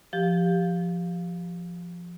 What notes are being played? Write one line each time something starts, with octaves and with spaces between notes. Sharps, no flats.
F3 G4